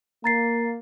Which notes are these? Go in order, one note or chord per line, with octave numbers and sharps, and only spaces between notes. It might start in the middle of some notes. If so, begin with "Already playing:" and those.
A#3 A#5 A6 C7